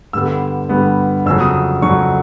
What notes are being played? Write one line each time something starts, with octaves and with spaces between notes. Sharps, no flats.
G2 D3 G3 B3 E6
G2 D3 G3 B3
F2 C#3 F#3 E6
D#6
F2 C#3 F#3 C#6